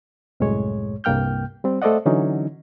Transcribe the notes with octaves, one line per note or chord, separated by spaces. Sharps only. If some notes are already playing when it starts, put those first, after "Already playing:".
C2 F#2 A2 G#3 C#5
C2 G2 A#3 G5 F6 G6
G3 C4
A3 A4 C5 D5 D#5 F#5
D3 E3 F#3 C#4 D#4